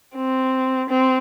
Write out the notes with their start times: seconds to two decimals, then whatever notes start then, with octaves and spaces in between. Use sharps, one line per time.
0.16 C4
0.89 C4